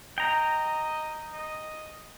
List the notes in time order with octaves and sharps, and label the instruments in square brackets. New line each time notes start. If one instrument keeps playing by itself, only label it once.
[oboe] D#5 [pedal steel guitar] G5 A#5
[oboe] D#5